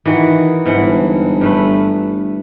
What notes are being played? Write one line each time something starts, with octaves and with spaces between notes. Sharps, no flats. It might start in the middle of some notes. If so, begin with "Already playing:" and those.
D#3 E3 F#4
G1 G#2 E3 F#5
G2 A3 B4